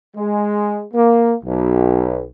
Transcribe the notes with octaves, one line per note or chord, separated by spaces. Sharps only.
G#3
A#3
B1